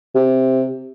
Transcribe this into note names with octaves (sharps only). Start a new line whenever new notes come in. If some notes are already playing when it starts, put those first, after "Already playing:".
C3